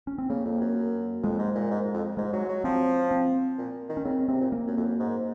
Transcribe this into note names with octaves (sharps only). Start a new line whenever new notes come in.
C#4
C4
C#3 A#3
F2
F#2
F2 G#3
G#2
A#2
G#2
F2
G#2 G#3
F#3
F#3
F3 C4
C4
A#2
D#3
C#4
C#3 C4
C3 C4
A#2
A#3
F#2
F2
F#2
G#2